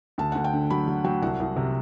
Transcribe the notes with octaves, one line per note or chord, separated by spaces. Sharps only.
D2 A5
D2 F#5
G5
D3
F#3 B5
F#3
F#3 G5
C2 F#5
C2
C3